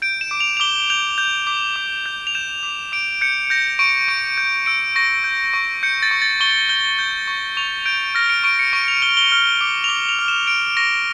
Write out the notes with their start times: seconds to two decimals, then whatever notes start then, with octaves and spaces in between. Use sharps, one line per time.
0.02 G6 D7
0.21 E7
0.31 D6
0.40 F7
0.57 F7
0.60 D6 G7
0.90 G6 F7
1.18 G6
1.47 D6
1.76 D6
2.06 G6
2.27 F7
2.35 G6 E7
2.63 D6
2.92 D6 D7
3.21 G6 C#7
3.50 G6 A#6
3.79 C#6 D7
4.08 C#6 D7
4.38 G6
4.66 E6 D7
4.96 C#6 A#6
5.24 G6
5.54 C#6
5.83 G6 C#7
6.03 A6
6.11 C#6
6.22 A6
6.40 C#6 G7
6.69 G6 G7
6.99 G6
7.28 C#6
7.57 C#6 F7
7.85 G6 D7
8.15 F6 A#6
8.30 D7
8.44 C#6 D7
8.59 C#7
8.73 C#6 D7
8.88 F7
9.02 F6 G7
9.17 G7
9.32 F6
9.61 D6
9.84 F7
9.89 D6 G7
10.09 F7
10.19 F6
10.28 E7
10.47 F6 D7
10.77 C#6 A#6